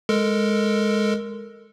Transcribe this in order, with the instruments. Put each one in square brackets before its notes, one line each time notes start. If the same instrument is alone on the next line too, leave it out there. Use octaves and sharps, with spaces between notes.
[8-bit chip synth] G#3 A4 A#4